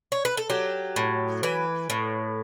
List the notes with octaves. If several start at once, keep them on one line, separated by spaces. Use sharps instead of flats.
C#5
B4
A4
F#3 G4
A2
E3 B4
A2